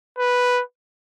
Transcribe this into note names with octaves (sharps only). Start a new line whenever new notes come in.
B4